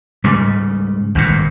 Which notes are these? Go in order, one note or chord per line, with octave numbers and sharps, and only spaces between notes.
G#2 C#3 G3
G#1 G2 A#2